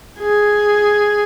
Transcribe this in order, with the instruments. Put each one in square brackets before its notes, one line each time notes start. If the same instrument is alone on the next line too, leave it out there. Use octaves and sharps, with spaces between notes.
[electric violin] G#4